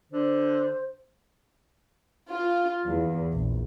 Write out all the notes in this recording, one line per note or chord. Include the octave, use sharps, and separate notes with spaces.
D3 C5
F4
E2
A#1